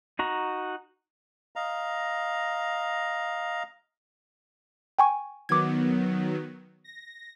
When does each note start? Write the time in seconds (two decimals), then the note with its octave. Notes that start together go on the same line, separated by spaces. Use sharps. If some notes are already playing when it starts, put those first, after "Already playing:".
0.19 D#4 F#4 A#5
1.56 D#5 F5 A#5
4.99 G5 G#5 C#6
5.49 D#3 F#3 B3 D6 G#6
6.84 A#6